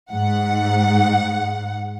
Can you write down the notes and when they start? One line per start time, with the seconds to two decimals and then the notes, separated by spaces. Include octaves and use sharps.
0.12 G#2 F#5